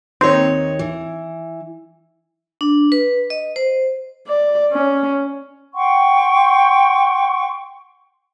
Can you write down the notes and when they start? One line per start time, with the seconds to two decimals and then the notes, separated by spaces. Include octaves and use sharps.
0.21 D#2 C4 D#4 C#5
0.79 E3
2.61 D4
2.92 B4
3.30 D#5
3.56 C5
4.27 D5
4.72 C#4
5.74 F#5 G5 C6 C#6